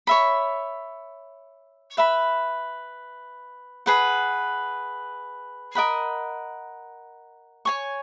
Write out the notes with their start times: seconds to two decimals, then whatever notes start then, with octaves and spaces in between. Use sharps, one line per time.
0.07 C#5 E5 B5
1.97 B4 E5 B5
3.86 G#4 B4 F#5
5.75 A#4 D#5 F#5 B5
7.65 C#5 G#5 C#6